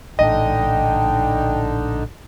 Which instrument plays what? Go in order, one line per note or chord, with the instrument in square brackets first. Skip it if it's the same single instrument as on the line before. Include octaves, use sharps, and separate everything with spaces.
[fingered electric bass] A#1 A2 [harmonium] D3 D4 D#4 [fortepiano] D#5 [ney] G5